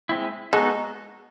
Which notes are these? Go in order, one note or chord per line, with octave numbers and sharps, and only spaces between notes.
G#3 C4 E4
G#3 B3 D#4 F#4 A4